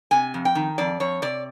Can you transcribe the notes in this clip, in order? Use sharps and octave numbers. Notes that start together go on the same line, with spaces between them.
C3 G#5
F2
G5
D#3
F2 D5
F2 C#5
C3 D5